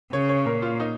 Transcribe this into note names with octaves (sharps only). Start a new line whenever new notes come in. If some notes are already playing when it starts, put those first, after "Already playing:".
C#3 C#5
C#5
A#2 A#4
F4
D#4